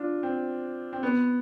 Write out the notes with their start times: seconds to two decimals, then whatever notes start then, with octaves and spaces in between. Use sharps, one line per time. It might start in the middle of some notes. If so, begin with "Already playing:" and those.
Already playing: D4 F4
0.23 C4
0.93 C4
1.03 B3